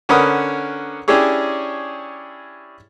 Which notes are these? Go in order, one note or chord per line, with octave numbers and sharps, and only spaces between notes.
D3 C#4 A#4 B4 F#5 D#6
C#4 D4 E4 G4 G#4 C#5